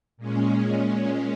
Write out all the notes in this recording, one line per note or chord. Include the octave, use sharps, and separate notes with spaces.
A#2 G#3 C#4